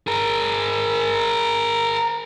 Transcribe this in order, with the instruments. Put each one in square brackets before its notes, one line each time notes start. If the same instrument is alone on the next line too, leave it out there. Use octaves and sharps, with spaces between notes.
[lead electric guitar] G#4 A#4